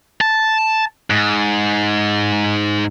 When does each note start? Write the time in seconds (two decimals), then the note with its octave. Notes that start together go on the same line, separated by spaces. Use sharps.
0.21 A5
1.10 G#2